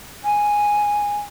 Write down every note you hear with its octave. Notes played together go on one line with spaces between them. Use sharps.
G#5